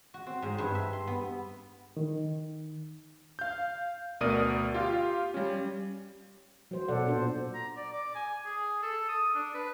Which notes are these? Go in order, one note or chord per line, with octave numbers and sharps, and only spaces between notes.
F#4
C4
G#2
G2
E5
C6
B3
D#3
F5 G6
D2 B2 A#4 D5 D#6 D#7
F4 G4 F5
G3 C#4
F#3 C5
B2 A4 D5 F#5
A#2 D4 C5
A#5
D5
D6
G#5
G#4
A4
D#6
D4
B4